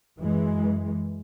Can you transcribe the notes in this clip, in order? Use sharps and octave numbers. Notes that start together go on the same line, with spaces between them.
F#2 E3 G#3